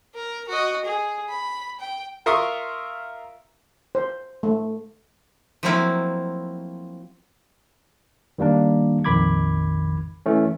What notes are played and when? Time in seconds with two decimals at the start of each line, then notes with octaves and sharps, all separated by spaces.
0.15 A#4
0.48 F#4 D#5
0.85 G#4
1.29 B5
1.80 G5
2.26 F4 A#4 E5 C6 C#6 D#6
3.95 C5
4.43 A3
5.63 F3 F#3 A3 A#3 C4 E4
8.38 D#3 G3 A#3 D4
9.04 A#1 F2 D#3 B5 D6 G#6
10.26 E3 A3 C#4